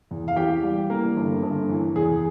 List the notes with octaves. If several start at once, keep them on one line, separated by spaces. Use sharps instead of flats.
E2
F5
E3 G4 G5
G3
E3 A#3 A#4
G1
G1
E3
E2 G#4